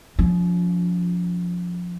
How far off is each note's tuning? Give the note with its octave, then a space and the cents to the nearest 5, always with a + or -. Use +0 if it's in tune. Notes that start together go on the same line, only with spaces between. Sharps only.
F3 +15 C#4 +45